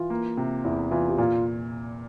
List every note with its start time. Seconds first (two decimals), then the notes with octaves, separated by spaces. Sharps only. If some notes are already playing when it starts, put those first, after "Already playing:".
Already playing: E3 F4
0.10 A#3
0.37 C3
0.64 E2 E4
0.91 E3 F4
1.09 G4
1.18 A#2 F4